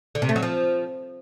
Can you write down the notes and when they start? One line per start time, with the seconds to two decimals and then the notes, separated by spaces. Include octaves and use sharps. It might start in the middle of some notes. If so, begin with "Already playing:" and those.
0.15 D3
0.22 C3
0.29 A3
0.36 F#3
0.43 F3